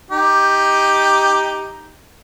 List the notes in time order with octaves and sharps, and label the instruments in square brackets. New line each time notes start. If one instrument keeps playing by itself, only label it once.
[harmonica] D#4 G4